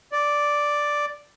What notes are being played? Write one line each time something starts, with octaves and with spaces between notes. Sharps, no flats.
D5